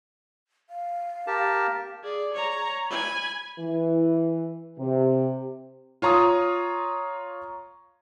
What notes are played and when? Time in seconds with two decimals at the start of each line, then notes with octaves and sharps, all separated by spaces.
0.70 F5
1.27 G4 A#4 A5
2.04 G#4 D5
2.34 C#5 A#5
2.88 G#5 B5
3.59 E3
4.78 C3
6.02 F4 C#5 A#5 C6 D#6